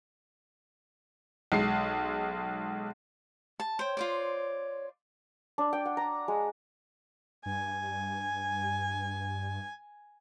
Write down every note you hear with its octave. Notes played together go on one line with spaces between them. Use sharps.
B1 G#3 C7
A5
C5 C#5 G5
F4 C5 D5
D4
G5
F#5
A#5
G#3
G2 G#5